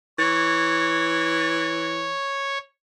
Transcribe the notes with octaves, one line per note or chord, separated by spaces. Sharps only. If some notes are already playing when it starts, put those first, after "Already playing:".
E3 C#5